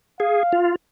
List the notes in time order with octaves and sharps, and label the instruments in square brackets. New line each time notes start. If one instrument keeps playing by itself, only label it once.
[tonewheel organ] G#4 [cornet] F5
[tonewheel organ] F4